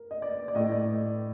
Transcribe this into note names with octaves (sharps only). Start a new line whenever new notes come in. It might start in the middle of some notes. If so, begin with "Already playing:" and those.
Already playing: A#4
D#5
D5
D5
A2 A3 D#5
D5